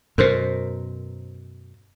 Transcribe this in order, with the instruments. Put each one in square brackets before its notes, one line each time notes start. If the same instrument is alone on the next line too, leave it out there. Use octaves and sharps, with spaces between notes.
[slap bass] F#2 B2 [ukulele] A#4 C5